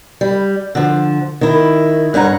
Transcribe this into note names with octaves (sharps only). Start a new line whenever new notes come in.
G3
D3 F3
D#3 E4
G2 C#4 F#5 A#5